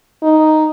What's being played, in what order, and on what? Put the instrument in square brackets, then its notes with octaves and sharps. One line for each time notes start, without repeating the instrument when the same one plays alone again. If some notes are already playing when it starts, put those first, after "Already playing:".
[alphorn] D#4